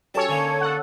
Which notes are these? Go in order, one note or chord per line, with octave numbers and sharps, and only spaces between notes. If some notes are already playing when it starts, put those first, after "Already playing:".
F#3 C#4 G4 A4 C#5 A5
D3 A#3 D#4
A4 F#5